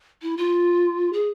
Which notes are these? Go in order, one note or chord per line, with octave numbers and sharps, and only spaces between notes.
E4
F4
G#4